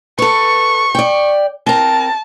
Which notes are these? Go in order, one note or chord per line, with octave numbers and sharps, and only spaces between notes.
A4 B4 C#6
D5 G5
C4 A#4 A5